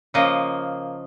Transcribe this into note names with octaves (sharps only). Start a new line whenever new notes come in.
C#3 F3 A#3 D#5